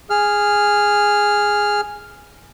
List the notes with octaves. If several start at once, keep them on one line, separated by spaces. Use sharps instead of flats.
G#4 F6